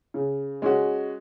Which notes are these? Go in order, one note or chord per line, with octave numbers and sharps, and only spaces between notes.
C#3
G#3 C#4 F#4